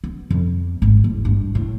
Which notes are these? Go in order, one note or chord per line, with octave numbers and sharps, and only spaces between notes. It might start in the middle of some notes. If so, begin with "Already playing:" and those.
B3
F2
G#1
E2
G2
A2